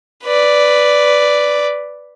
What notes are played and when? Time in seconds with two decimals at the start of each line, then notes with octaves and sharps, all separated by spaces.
0.24 B4 D5